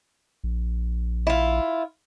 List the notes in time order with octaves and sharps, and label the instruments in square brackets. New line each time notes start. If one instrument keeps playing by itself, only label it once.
[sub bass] A#1
[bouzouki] E4 F4